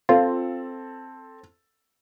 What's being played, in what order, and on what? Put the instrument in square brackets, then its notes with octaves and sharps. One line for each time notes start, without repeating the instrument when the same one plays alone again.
[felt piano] C4 A4 [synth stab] F4